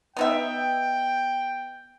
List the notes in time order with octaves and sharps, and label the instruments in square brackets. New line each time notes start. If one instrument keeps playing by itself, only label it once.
[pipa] B3 D#4 E5 [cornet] G5